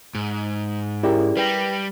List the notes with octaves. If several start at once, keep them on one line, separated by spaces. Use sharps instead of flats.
G#2
C#4 E4 G4 G#4 A#4 D5
G3 B4 G5 A#6